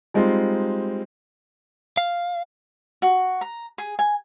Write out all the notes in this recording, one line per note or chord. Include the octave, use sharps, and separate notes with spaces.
G3 G#3 C4 D#4 F4
F5
F#4
A#5
G#4
G#5